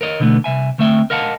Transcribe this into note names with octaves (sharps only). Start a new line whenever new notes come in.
A#4 C#5 D#5
B2 D3 E3 A3 B3
C2 E5 G#5
D2 A3 C4 E5 G5
A#4 D#5 F5 F#5 G#5 A5